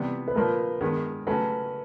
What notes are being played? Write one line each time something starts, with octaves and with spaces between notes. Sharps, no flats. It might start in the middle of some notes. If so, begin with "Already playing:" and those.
Already playing: C3 E3 G3 B3
B4
A#2 F3 A#3 A#4
G2 D#3 G#3 B3
C#3 F#3 A3 C#4 B4